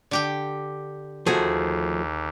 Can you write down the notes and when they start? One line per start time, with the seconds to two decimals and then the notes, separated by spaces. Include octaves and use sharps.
0.11 D3 G4 G5
1.27 D#2 F3 A3 F#4 G#4